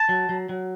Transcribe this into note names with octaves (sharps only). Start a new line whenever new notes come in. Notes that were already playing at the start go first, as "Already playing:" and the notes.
Already playing: A5
F#3
F#3
F#3